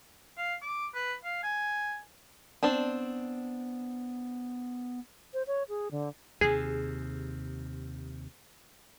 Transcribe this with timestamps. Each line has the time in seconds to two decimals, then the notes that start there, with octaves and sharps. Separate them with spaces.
0.38 F5
0.62 D6
0.95 B4
1.24 F5
1.43 G#5
2.63 B3 C4 D4 A5
5.34 C5
5.47 C#5
5.69 G#4
5.91 D3
6.41 D#2 C3 G#4